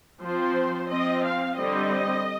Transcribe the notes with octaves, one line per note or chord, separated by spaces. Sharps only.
F3 C4 C5
F3 C4 D#5
F5
D3 G3 C4 D#5